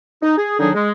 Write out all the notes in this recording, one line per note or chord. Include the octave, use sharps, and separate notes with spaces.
D#4
G#4
D3 D#3 F#3 D4 D#4 G#4
G#3